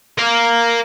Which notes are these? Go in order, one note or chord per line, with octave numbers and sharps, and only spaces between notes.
A#4 F5